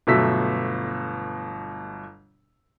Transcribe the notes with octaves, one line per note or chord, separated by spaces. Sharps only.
G1 B2 F#3 A3 E6 B6